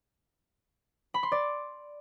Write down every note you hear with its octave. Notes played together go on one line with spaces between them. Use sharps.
B5
C6
D5